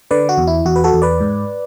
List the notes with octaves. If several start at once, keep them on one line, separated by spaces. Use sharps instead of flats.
D3 B4 D5
F#4
E2
E4
E2 F#4
B4
F#4 A4
E2
B4 D5
G#2